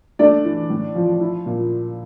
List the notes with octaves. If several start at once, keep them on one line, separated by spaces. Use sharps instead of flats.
A3 D4 D5
E3
A2
F3
E4
A#2